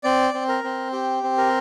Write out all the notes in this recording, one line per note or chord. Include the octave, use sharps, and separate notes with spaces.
C4 D5
C4
A#4
C4
G4
C4
A#4